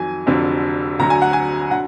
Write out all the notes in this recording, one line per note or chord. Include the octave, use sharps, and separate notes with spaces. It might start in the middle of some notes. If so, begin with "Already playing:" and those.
Already playing: F2 D#3 F#3 G#5
F1 F2 D3 F#3
D2 D3 F#3 A#5
G#5
F#5
G#5
D3 F#3 F#5